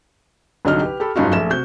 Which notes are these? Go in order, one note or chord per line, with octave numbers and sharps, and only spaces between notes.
C2 D3 F#3 D#4 D#5 F6
G4 B4
G4 A4 B5
F#1 G2 C#4 D#4 F4 F#4
A#1 A3 E5 E7
C3 F#4 G6